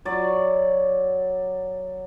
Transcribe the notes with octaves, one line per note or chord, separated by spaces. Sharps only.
F#3 D5